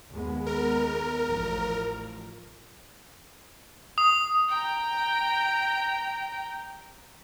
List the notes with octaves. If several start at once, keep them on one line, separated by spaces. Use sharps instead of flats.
D#2 G#3 B3
A#4
A1 F3
D#6
G5 A#5